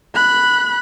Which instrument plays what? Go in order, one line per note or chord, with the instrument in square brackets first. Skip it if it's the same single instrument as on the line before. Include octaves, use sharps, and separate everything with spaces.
[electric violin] B5 F#6